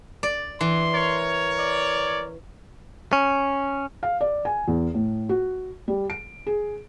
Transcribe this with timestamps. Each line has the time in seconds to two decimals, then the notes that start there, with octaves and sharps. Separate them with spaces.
0.23 D5
0.61 E3 C6
0.93 A#4 C#5
1.59 D5
3.13 C#4
4.03 F5
4.21 D5
4.45 G#5
4.68 E2
4.94 A2
5.29 F#4
5.88 G3
6.10 D7
6.47 G#4